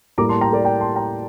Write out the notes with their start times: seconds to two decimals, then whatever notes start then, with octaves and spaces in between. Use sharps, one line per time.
0.18 A2 G3 A#3 A#5 D6
0.29 A5 C6
0.41 G5 A#5
0.53 A#4 D5
0.65 G5 A#5
0.80 A5 C6
0.96 G5 A#5